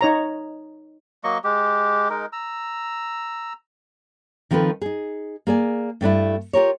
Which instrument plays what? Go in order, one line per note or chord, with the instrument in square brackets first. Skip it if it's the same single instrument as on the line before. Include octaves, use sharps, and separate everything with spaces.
[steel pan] D#4 C#5 A#5
[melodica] F#3 A#3 D#5 C#6
G#3 G4
G#3 D#4 A#4
A#5 E6
[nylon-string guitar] D#3 F3 C4 A4 B4
D#4 G#4
A#3 G#4 D5 G#5
G2 A3 D4 E4
F4 G4 A#4 C#5